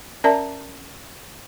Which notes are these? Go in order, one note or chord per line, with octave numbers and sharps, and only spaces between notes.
C#4 A#4 D5 E5 A5 A#5